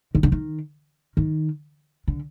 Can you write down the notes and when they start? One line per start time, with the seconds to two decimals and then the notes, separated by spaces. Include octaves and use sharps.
0.15 D#3
0.23 D3
0.32 D#3
1.17 D#3
2.08 D3